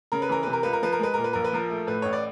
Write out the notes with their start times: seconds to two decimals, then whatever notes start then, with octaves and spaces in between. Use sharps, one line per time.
0.12 C#3 A#4
0.22 B4
0.29 E3 A#4
0.43 C3 B4
0.53 A#4
0.63 C#2 B4
0.73 A#4
0.83 F3 B4
0.93 A#4
0.99 G#3 B4
1.14 A#2 A#4
1.24 B4
1.33 A#1 A#4
1.44 B4
1.53 F3 A#4
1.70 A3
1.87 A2 B4
2.02 A1 C#5
2.13 D5